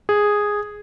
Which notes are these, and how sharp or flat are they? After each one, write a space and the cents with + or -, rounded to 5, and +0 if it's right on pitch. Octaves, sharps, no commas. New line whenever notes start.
G#4 -5